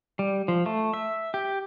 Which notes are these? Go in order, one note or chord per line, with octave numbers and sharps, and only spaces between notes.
G3
F3
A3
E5
G4